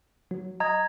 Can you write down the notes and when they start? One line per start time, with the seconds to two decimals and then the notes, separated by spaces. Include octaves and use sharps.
0.31 F#3
0.60 D#5 A#5 G#6